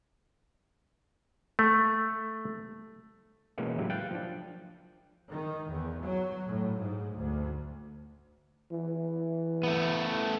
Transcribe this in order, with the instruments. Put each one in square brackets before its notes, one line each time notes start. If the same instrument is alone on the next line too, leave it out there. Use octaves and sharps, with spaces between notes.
[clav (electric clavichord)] A3
[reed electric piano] B2 E3 G#3 A#3 B3 C#4
A2 C#3 F#3 E4 G4
F5 G5 F#6 A6
F3 D4
[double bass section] D#3
E2
F#3
A2
G#2
D2
[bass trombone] E3
[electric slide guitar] A3 B3